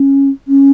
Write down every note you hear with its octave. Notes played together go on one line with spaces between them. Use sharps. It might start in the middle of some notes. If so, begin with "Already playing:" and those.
Already playing: C#4
C#4